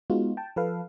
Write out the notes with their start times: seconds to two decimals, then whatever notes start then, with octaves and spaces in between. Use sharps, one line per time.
0.10 G#3 B3 D#4 F4 F#4
0.37 G5 A5
0.56 F3 A4 B4 F5